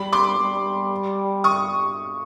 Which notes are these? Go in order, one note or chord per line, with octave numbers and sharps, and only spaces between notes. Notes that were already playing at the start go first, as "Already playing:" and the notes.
Already playing: G3 B5
C6 D6
G3
C#6 D#6